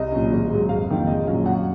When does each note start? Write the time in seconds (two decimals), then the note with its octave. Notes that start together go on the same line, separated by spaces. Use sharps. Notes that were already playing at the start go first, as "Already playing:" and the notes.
Already playing: C2 D#5
0.12 A#2 F#3 C#4
0.31 G#1
0.50 G#2 F#3
0.69 F1 F5
0.89 F2 D#3 A#3
1.07 A#1 D#5
1.27 A#2 F#3 C#4 F5
1.46 F#2 F#5